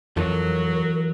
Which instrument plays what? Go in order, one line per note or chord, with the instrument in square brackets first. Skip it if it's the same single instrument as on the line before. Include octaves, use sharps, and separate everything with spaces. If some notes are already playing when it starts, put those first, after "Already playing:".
[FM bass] F2 [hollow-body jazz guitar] E3 F4 A4 [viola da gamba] F#3 [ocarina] A#4